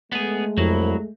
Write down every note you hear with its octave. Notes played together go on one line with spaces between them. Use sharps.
G#3 A3 B3 G#4
C2 F2 F#3 E4